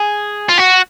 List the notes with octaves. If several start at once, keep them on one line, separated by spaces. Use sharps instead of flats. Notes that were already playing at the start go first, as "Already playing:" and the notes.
Already playing: G#4
F4
F#4